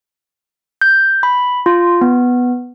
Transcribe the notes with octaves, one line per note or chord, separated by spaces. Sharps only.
G6
B5
F4
B3